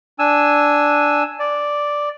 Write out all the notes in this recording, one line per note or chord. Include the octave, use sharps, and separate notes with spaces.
D4 G#5 E6
D5